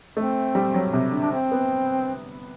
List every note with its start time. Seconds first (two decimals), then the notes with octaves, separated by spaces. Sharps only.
0.17 A3 C4
0.55 G3
0.74 F#3
0.93 C3
1.12 D3
1.21 D4
1.31 C4
1.52 B3